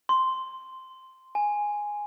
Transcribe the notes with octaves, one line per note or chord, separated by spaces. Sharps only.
C6
G#5